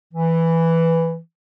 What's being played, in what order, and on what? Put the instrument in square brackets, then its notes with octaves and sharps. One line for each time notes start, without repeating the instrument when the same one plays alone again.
[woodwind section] E3